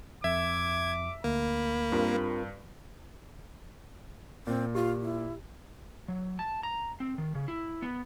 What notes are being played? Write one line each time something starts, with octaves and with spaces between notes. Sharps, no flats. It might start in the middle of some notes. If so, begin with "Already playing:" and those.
F2 E5 D6 G#6
D2 A#3 B5
G2 C4 F4 A#4
A#2 C4
F4 G4
E4
F#3
A5
A#5
C4
D#3
C#3
E4
B3